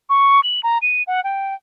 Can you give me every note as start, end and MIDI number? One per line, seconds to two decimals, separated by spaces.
0.10 0.40 85
0.44 0.60 102
0.63 0.78 82
0.82 1.03 99
1.07 1.23 78
1.24 1.54 79